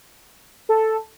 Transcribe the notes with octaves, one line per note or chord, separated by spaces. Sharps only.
A4